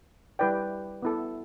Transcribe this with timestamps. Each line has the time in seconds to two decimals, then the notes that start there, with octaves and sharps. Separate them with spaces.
0.39 G3 E4 B4 D5 G5
1.03 B3 E4 A4